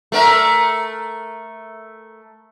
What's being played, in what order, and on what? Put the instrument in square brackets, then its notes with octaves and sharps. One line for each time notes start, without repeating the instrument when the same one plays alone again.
[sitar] A3 A#4 E5